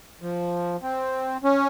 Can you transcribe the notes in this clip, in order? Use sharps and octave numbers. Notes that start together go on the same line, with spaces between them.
F3
C4
C#4